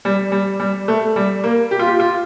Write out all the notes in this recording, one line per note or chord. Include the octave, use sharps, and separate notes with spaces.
G3
G3
G3
A3
G3
A#3
G4
F4
G4
F4